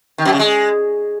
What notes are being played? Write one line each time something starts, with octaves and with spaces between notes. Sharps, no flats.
D#3
F#2
C#3
G#3